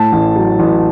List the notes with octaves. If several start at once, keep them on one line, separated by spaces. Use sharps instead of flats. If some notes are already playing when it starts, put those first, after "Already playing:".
Already playing: A2 A5
A1
F#3
A1